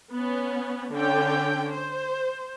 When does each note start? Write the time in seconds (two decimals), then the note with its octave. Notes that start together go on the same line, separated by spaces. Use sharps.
0.14 B3 C#4
0.93 D3 C#4 G5
1.70 C5